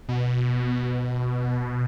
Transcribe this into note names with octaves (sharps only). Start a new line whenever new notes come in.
B2